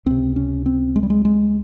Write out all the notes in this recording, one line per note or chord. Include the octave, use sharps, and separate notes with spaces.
C#2 C3 C4
C#4
C4
G#3
G3
G#3
G#3